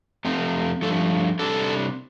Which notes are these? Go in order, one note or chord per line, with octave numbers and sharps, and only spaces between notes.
F2 C3 A3 C4
G2 F3 A3 A4
C3 G3 D4 A4